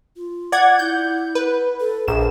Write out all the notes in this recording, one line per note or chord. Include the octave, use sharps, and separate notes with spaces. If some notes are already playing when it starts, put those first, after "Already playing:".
F4
D5 F#5 G#6
E4 G6
B4
A4
A#1 G#4 E7